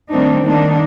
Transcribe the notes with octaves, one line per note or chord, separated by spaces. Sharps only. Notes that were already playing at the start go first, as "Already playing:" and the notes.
D#3 G3 A3 C4 D4 D#4
D#3 A#3 D4 D#4